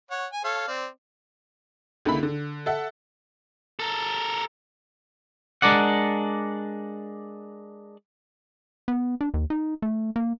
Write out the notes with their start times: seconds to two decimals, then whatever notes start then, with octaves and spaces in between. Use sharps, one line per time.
0.11 C#5 F#5
0.32 G#5
0.44 A4 C#5 F5
0.68 C4 D5
2.05 C#2 D3 A#3 E4 B5
2.23 D3
2.66 A4 E5 F#5
3.79 A4 A#4
5.62 G#3 D4 A#4 D5 F#5
8.88 B3
9.21 D4
9.34 D#2
9.50 D#4
9.82 A3
10.16 A#3